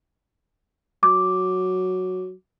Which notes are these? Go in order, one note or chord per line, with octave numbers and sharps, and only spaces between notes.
F#3 D6